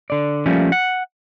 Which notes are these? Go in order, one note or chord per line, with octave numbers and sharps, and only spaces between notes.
D3 D5
F3 G3 A3 A#3 C#4
F#5